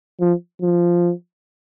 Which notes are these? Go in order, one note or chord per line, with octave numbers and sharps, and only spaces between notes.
F3
F3